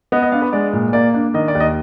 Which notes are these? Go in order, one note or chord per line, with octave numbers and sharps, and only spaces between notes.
B3 D#5
D#5
D4 F5
B4
G#3 D5
A#2
A#3 D5
D4
D#3 D#5
D5
D#2
D#5